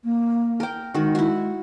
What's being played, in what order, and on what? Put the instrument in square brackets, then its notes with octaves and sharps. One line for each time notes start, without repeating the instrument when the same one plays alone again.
[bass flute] A#3
[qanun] A#4 G5
[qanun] D#3 F#4 [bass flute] G#3
[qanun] E4 F#4